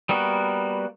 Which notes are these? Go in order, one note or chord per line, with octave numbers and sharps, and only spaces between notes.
G3 A#3 B3 F#4